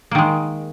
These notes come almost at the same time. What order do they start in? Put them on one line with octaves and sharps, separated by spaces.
A#3 D#3 G#3